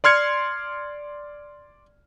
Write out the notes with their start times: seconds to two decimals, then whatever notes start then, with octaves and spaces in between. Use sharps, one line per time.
0.04 D5 C6 F6 G#6 C#7